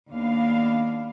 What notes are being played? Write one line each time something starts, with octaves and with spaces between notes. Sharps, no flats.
D#2 B3 D4 F5